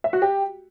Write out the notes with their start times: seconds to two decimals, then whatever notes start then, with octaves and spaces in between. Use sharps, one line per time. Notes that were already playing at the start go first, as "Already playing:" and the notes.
0.04 E5
0.13 F#4
0.22 G4